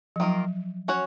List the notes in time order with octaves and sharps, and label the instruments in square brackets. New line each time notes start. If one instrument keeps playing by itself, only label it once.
[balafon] F3
[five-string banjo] D#3 A#3 F4 A#4 [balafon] F#3
[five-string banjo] C#4 F#4 C#5